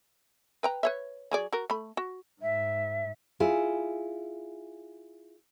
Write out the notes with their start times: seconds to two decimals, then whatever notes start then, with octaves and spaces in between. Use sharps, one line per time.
0.63 B4 G5 A#5
0.83 B4 C#5 E5
1.31 F#3 G#4 D5
1.53 F#4 A#4
1.70 A3 B5
1.97 F#4
2.41 G#2 E5
3.40 E4 F4 G#4